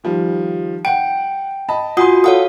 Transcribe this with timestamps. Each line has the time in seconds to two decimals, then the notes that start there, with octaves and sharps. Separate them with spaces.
0.04 D#3 F3 G3
0.85 F#5 G5 D7
1.69 D#5 A5 B5
1.97 F4 F#4 F#5 G#5 C6 D#6
2.24 A4 C#5 F5 F#5 D#6